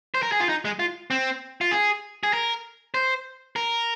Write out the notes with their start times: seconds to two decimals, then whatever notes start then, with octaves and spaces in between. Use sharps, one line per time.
0.14 C5
0.23 A#4
0.32 G#4
0.40 F4
0.49 D#4
0.65 G#3
0.79 F4
1.11 C4
1.61 F4
1.71 G#4
2.23 G#4
2.33 A#4
2.94 C5
3.56 A#4